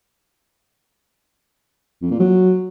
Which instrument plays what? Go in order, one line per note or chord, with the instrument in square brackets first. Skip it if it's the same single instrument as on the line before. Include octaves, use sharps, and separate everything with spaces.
[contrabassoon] F2
A#2
F#3